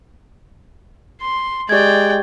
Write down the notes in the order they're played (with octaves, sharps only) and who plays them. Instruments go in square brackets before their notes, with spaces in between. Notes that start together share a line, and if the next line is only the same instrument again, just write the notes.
[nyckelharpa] C6
[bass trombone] G#3 [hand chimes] G4 G#6 [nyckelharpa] D5 G5